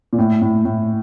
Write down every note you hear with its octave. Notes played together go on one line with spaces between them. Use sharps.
A#2
A2
A2
A2